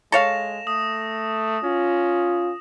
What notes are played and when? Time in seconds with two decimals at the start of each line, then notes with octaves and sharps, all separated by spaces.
0.12 G#3 A4 C#5 F5 A#6 E7 F7
0.67 A3 D#6
1.64 C#4 F4